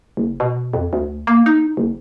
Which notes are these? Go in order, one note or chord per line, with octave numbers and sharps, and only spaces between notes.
F#1
B2
F2
D2
A#3
D#4
F#1